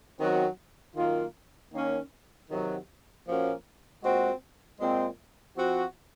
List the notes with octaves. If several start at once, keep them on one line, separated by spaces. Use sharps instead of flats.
F#2 D#3 F#3 C4 F#4
F#2 D#3 A#3 F4
D#3 A#3 C#4
C3 D#3 F#3
A#2 F3 A#3 C#4 F#4
A#2 G#3 C4 F#4
A#2 G#3 C4
F3 C4 F#4